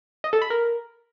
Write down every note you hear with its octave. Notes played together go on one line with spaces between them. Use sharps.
D#5
A4
B5
A#4